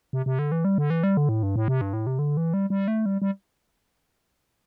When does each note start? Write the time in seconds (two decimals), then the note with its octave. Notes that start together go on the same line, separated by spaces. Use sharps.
0.13 C3
0.26 C3
0.39 D3
0.52 E3
0.65 G3
0.78 D3
0.90 E3
1.03 G3
1.17 D3
1.29 A2
1.43 G2
1.56 A2
1.68 C3
1.81 G2
1.93 A2
2.07 C3
2.19 D3
2.37 E3
2.54 G3
2.70 G3
2.88 A3
3.06 G3
3.22 G3